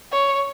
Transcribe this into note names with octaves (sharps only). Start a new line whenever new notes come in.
C#5